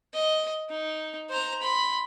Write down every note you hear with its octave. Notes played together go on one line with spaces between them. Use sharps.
D#5
D#4
C5 A#5
B5 C6